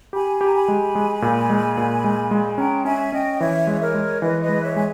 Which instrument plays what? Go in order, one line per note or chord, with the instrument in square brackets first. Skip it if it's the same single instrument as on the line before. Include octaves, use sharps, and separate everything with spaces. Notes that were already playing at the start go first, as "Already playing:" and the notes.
[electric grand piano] G4 [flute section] G#5 B5
[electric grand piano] G4 [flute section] A#5
[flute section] G#5 B5
[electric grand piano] G#3
G#3
A#2
G#3
A#2
G#3
G#3
[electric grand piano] C#4 [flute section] G5 A#5
[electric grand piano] C#4 [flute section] E5 G#5
[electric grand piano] C#4 [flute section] D#5 G5
[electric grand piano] E3 [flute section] C#5 E5
[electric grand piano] G#3
[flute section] A#4 C#5
[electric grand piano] G#3
[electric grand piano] E3 [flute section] B4 D#5
[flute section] B4 D#5
[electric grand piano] G#3
[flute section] C#5 E5
[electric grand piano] G#3 [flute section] G#5